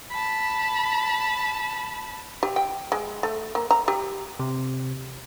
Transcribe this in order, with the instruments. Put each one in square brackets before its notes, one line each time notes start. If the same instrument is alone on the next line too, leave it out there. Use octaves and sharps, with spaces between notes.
[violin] A5 B5
[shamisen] G4
G5
G#3
A3
A#3
A#5
G4
[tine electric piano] C3